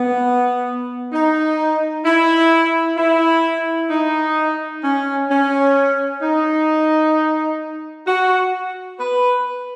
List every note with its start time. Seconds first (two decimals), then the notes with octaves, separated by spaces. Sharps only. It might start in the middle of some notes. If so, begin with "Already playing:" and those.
Already playing: B3
1.12 D#4
2.05 E4
2.97 E4
3.90 D#4
4.83 C#4
5.29 C#4
6.22 D#4
8.07 F#4
8.99 B4